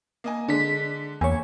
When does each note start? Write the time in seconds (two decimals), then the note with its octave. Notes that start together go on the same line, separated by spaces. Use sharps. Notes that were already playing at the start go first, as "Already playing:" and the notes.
0.24 A#3 D#5 G#5
0.48 D3 G#3 D4 B6
1.21 E2 A#3 C#5 G#5